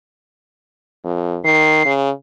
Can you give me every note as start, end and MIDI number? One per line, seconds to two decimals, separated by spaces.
1.04 1.39 41
1.44 1.81 51
1.44 1.91 96
1.85 2.10 49